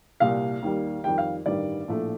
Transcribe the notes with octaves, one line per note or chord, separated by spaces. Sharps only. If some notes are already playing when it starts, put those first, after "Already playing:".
C2 A#2 G3 F5
D#2 D#3 G3
F2 D#3 G3 G5
F5
A1 G2 D#3 G3 D5
A#1 A2 F3 A3